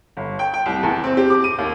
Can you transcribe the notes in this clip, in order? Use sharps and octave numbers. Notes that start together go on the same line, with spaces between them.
G1
G5
G5
C2
E2
C4
G4
D6
D#7
D#2